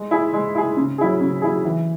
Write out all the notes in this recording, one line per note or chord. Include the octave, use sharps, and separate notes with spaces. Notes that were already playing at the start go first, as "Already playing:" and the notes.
Already playing: G#3
E4 G#4
G#3
E4 G#4
C#3
F#3 E4 G#4
C#3
F#3 E4 G#4
E3